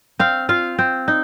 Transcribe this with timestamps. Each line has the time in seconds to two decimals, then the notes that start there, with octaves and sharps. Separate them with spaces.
0.19 C4 F5
0.49 F4 F5
0.79 C4
1.08 D#4